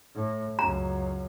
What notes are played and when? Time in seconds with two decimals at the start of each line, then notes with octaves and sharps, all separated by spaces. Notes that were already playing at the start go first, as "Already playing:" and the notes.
0.15 A2
0.59 C#2 F#2 A#5